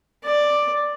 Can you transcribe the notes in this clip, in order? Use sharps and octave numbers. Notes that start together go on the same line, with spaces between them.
D5